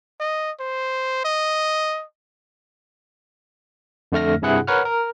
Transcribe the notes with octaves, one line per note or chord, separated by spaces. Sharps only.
D#5
C5
D#5
F2 D3 A3 F6 A#6
G2 C3 E4 G#4 F#5 F#6
A#4 B4 C#5 F#5 F6
A#4